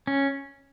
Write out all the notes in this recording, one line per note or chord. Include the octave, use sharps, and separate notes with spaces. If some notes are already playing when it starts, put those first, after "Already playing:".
C#4